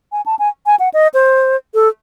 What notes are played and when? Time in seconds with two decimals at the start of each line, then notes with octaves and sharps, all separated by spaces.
0.12 G#5
0.26 A5
0.39 G#5
0.66 G#5
0.80 F#5
0.94 D#5
1.14 C5
1.74 A4